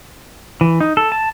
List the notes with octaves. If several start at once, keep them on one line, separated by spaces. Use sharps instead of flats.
E3
D#4
A4
A5